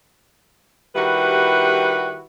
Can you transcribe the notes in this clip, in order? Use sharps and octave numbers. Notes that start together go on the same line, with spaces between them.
D#3 G3 E4 F#4 G4 B4